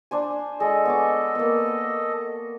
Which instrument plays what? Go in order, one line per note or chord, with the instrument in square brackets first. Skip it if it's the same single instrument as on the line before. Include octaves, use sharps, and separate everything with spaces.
[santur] D4 C5 G#5
[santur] G#3 [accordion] A4 D#5
[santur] B3 C#5 D6
A#3 B3